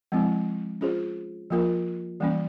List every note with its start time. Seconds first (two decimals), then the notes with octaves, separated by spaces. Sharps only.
0.12 F3 G#3 C4 E4
0.81 C#4 F4 G#4 C5
1.50 F3 A#3 F4 A#4
2.20 E3 G3 A#3 C#4